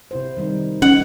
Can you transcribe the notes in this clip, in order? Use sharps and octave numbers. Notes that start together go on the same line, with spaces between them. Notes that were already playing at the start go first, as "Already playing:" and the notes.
C3 E4 C5
D#3 G3 D#4
C#4 F#5